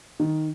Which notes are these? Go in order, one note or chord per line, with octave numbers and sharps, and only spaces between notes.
D#3